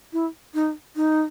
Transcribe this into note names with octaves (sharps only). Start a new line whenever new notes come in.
E4
D#4
D#4